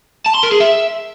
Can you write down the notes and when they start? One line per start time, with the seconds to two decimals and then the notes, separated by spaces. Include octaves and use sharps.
0.26 A5
0.34 C6
0.43 A#4
0.52 G#4
0.60 E5